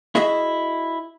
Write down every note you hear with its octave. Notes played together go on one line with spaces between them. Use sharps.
E4 F#4 G#4 D#5 E5